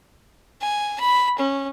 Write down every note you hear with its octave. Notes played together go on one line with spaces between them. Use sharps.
G#5
B5
C#4